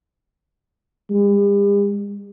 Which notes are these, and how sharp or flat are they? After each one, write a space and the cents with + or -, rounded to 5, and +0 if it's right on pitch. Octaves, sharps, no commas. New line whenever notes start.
G3 +45